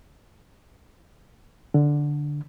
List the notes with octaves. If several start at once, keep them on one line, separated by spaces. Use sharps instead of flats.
D3